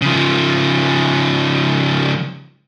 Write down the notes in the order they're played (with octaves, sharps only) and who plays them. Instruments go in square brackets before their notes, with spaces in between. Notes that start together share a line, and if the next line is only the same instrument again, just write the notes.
[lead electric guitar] C#3 F3